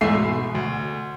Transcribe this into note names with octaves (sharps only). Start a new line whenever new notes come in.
E2 G#2 A3 E5 E6 C7
B2
D2